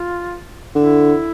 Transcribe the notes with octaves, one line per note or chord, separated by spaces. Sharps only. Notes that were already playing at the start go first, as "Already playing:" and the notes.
Already playing: F4
D3 E4